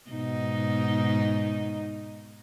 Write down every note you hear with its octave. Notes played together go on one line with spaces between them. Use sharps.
G#2 B2 D#4